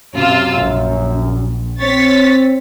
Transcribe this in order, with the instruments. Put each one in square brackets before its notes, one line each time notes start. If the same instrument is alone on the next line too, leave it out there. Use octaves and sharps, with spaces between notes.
[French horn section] F#2 [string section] C3 F4 E6
[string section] A#1
[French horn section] C4 [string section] C#5 A6 B6